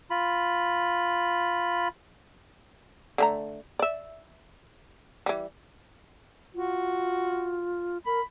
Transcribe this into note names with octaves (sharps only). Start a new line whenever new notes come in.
F4 B5
D3 A3 A#5
D5 E5
E3 G3
F4 F#4
A#4 B5